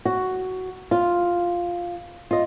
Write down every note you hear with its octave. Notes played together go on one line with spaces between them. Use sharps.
F#4
F4
F4 D#5